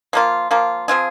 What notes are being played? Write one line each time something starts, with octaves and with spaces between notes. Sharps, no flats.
F3 A#3 F4
F3 A#3 F4
F3 C4 F4 G#4